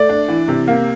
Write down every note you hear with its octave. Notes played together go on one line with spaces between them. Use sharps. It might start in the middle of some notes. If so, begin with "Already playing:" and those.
Already playing: A3 D5
D4
E3
C3
A#3